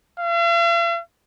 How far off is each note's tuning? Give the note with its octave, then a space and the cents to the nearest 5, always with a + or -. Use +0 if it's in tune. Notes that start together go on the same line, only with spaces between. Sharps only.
F5 -45